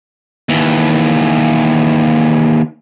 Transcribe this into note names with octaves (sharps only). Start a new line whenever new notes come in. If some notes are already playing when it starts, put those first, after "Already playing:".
D#2 E3